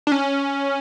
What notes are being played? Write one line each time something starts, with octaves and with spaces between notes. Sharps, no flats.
D4
C#4